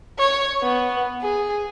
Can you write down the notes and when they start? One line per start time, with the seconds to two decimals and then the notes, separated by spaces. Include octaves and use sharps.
0.19 C#5
0.63 B3
1.22 G#4